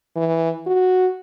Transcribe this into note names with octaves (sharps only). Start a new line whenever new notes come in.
E3
F#4